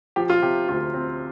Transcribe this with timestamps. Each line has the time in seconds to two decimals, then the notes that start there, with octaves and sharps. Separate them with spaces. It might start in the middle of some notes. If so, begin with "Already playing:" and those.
0.16 F3 G4
0.30 F4
0.42 C3 G4
0.69 D2 F4
0.94 C4